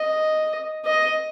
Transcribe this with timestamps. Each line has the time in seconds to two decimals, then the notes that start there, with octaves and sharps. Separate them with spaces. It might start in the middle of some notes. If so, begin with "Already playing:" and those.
Already playing: D#5
0.86 D#5